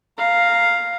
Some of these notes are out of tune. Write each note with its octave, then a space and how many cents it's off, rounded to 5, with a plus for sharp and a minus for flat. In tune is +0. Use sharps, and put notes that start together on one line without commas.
F5 +5 A#5 -10